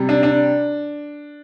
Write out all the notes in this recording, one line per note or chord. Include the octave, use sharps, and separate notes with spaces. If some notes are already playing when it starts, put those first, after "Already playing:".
Already playing: C3 G3
D4
D4